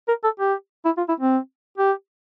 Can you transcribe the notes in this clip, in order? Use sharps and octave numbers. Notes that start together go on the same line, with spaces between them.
A#4
A4
G4
E4
F4
E4
C4
G4